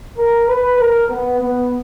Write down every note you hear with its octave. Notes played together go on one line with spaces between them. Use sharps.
A#4
B4
A#4
B3
B3